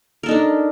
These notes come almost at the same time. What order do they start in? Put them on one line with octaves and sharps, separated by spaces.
A#4 A4 D#4 D4